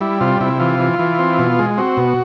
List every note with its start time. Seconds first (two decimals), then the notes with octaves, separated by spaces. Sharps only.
0.01 G3 E4
0.21 C3 F4
0.40 C3 E4
0.60 E3 F4
0.79 E3
0.99 E3
1.19 C4
1.39 B2
1.59 G#3
1.78 C4 F#4
1.97 B2